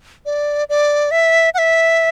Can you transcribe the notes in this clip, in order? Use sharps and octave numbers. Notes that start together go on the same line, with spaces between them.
D5
D5
E5
F#5
E5